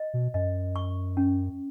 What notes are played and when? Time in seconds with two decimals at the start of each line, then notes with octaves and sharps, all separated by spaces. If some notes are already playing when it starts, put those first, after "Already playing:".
Already playing: D#5
0.14 B2
0.34 F#2 D#5
0.76 C#6
1.17 C#4